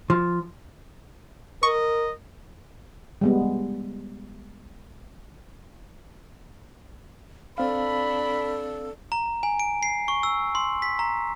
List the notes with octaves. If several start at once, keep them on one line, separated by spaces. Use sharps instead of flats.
F3
A#4 D#5 C#6
G3 G#3 B3
C4 D4 A4 F5 B5
A#5
G#5
D7
C7
C#6
E6
C6
B6
A#5